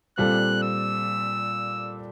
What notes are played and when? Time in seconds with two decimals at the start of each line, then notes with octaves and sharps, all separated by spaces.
0.18 A#2 G3 C4 F4 A4 F#6
0.63 E6